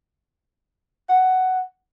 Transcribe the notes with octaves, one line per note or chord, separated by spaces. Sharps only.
F#5